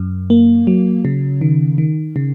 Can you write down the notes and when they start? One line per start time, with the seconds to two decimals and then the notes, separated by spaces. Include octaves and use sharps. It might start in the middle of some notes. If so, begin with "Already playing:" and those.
Already playing: F#2
0.30 A#3
0.67 F#3
1.05 C#3
1.41 D#3
1.78 D#3
2.16 C#3